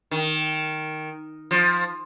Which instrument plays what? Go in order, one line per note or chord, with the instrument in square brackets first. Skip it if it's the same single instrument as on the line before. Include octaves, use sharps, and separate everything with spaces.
[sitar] D#3
F3